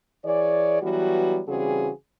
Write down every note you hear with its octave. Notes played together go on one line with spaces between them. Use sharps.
E3 G#4 C#5 D5
E3 F#3 G3 B3 F#4
C#3 E3 G3 C4 F#4 G#4